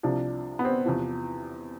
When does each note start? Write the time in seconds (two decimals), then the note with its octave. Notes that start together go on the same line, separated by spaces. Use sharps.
0.03 C2 C3 F3 D4
0.59 B3
0.65 C4
0.85 E2 C3 F3